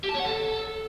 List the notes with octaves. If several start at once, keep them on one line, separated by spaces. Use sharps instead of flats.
G4
A5
C#5
F#5
A4